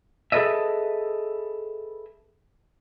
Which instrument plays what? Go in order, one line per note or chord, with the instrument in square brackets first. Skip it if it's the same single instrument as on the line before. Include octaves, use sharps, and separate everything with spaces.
[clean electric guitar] G#4 A4 B4 C#5 D#5 E5